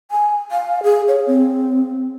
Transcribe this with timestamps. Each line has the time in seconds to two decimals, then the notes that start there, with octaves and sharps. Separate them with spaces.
0.11 G#5
0.51 F5
0.83 G#4
1.08 C#5
1.27 C4